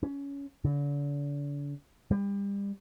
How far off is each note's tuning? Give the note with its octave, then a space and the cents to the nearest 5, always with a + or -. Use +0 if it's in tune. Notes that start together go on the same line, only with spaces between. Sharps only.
C#4 +20
D3 -40
G3 +30